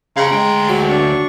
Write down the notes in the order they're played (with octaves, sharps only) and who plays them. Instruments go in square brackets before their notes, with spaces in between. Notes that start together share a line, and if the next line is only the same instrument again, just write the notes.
[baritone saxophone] C#3 [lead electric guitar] F5 G5 [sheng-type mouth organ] A#5 C6
[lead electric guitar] D2 G5 [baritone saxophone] G#3
[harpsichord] F#3
[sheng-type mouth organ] D4 C#6